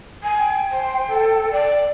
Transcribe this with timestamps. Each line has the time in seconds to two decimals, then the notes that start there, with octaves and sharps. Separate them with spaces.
0.23 G#5
0.38 G5
0.70 C5
1.07 A4
1.51 D5